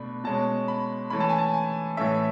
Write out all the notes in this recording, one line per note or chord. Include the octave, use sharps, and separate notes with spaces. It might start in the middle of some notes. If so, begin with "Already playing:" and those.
Already playing: B2 A3 D4 B5
B2 G#3 C#4 A5
B5
E3 A3 C#4 B5
A5
G#5
A5
G#5
A2 E3 A3 C#4 E5